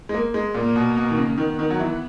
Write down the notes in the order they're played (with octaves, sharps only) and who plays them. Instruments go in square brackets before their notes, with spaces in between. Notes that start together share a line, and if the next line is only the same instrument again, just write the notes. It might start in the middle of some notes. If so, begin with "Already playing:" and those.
[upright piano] G#3
A#3
G#3
[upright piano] A#2 [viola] A#3
[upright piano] B2
B2
D#3
C#3
[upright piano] D#3 [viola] B3
[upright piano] D#3
F#3
E3